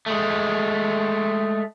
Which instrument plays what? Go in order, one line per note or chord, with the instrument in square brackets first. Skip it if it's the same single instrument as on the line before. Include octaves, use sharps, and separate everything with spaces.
[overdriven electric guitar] G#3 A3